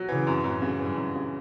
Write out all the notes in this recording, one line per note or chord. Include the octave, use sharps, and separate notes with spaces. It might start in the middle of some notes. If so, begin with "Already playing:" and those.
Already playing: F#3
C#3 E3
F#2
F#2 A2
C#3
G2 E3
F#2
C#3